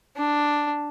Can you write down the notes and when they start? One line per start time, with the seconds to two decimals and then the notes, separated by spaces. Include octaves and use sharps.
0.17 D4